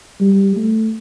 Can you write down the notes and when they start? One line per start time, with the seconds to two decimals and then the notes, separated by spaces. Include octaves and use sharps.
0.20 G3
0.56 A3